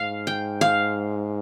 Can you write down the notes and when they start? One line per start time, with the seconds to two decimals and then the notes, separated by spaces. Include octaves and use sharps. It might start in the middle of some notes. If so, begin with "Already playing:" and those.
Already playing: G#2 F5
0.27 G5
0.61 F5